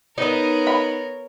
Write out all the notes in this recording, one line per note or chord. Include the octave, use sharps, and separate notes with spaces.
B3 D#4 A#4 C#5 D#5
B5